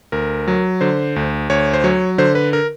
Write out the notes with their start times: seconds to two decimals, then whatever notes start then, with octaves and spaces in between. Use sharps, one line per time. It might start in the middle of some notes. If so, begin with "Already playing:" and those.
0.12 D2 A#4
0.48 F#3
0.81 D3 C5
1.16 D2
1.50 D2 C#5
1.73 C5
1.84 F#3 C#5
2.18 D3 C5
2.35 B4
2.53 A#4